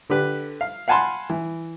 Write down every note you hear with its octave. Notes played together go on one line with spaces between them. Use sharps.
D3 G4 B4
F5
F5 F#5 G#5 A5 B5 C6
E3